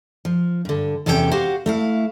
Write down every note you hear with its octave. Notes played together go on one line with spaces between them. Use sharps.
F3
G2 D3
E2 C3 C#4 A4 B4 G5
F#4 G4 C5 F5 F#5
A3 E4 F5